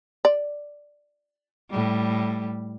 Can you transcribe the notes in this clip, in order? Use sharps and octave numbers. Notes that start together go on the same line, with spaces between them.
D5
A2 G3